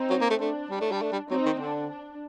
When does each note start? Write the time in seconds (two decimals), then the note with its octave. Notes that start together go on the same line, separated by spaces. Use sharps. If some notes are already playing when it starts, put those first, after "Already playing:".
Already playing: C4 D#4
0.10 F#3
0.21 A#3
0.30 A3
0.40 A3 D4
0.71 G3
0.81 A3
0.92 G3
1.02 A3
1.12 G3
1.30 F#3 C4 D#4
1.46 D#3
1.60 D3 D4
1.90 D4